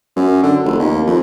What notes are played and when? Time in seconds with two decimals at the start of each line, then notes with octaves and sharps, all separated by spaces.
0.16 F#2
0.43 D3
0.64 F1
0.80 D#2
1.07 F2